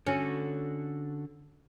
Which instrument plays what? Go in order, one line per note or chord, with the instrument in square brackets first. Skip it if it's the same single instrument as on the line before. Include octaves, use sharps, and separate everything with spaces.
[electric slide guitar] D3 F#4 A4 [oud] C#4